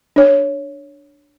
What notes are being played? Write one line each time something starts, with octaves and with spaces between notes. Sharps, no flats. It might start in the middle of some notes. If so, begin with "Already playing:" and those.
D4 C#5